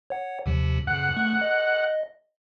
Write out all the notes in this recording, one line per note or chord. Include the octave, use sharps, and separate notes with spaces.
C#5 F#5
D#2 C3 F3
F#2 C#3 F#5
A3
D#5